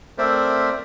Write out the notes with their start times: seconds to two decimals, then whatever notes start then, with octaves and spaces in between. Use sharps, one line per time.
0.18 A3 C4 A#4 C5 D5 E5